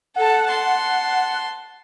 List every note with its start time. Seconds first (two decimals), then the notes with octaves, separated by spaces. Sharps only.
0.16 A4 F#5 A5
0.47 A5 C6